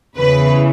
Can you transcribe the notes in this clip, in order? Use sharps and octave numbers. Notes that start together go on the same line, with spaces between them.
E2 C#3 E3 B4